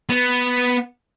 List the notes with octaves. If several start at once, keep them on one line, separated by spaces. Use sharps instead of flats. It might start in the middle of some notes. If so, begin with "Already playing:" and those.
B3